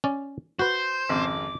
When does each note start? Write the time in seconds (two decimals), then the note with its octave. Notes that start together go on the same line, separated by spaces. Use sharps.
0.04 C#4 D5
0.59 F#4 B4 C5 G6
1.09 G#1 F2 C#3 D6